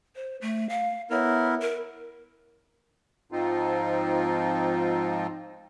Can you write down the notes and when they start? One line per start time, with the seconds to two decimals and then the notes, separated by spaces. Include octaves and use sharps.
0.16 C5
0.41 A3
0.69 F5
1.11 B3 E4 A#4 C#5
1.62 A#4
3.32 G#2 F3 C4 D#4 F4